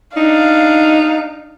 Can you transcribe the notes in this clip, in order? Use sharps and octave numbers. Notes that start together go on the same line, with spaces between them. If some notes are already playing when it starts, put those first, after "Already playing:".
D4 D#4 F5